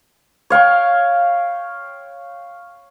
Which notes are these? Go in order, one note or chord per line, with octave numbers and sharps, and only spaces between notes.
C#5 F5 G5 C#6